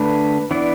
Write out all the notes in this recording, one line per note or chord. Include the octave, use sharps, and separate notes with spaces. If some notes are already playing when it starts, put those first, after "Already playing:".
Already playing: D3 A3 D4 B4
E3 B3 D4 D5